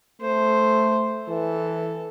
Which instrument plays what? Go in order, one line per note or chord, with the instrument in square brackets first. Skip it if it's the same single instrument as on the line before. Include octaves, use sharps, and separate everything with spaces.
[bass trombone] A3 [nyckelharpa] C5
[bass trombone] E3 [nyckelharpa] A4